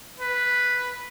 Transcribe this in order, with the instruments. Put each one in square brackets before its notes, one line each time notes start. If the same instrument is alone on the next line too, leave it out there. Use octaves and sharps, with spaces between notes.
[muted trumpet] B4